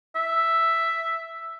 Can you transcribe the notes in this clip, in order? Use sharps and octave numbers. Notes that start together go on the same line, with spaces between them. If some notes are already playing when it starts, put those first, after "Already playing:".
E5